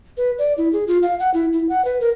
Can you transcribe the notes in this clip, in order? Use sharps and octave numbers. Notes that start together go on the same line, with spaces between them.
B4
D5
E4
G#4
F4
F5
F#5
E4
E4
F#5
B4
A#4